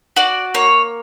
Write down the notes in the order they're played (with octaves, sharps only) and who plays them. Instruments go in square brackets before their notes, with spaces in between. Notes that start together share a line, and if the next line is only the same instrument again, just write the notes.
[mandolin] F#4 D5
A#3 C#5